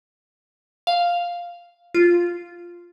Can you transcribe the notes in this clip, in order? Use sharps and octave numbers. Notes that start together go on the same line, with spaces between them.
F5
F4